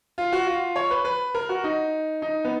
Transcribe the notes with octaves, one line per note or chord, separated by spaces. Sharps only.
F4
F#4
F4
C#5
B4
B4
A#4
F#4
D#4
D#4
B3